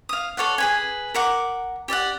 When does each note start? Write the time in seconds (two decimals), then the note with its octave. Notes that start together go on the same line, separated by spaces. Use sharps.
0.09 F5 D#6
0.37 A4 C#5 D5 F#5
0.58 G#4 B4 G#5
1.14 A#4 F#5 D6
1.88 G4 D5 E5 F#5